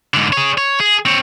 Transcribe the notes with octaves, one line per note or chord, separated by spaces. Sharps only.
G#2 D3
G#4 C#5
C#5
G#4
C4 C#5